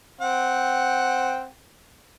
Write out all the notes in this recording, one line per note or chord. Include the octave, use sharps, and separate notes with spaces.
C4 F#5 G5